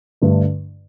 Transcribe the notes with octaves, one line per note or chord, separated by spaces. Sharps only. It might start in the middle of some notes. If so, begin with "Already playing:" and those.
G2 D3 A3